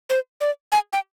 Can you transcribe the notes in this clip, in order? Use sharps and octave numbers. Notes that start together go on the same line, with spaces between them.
C5
D5
G#5
G5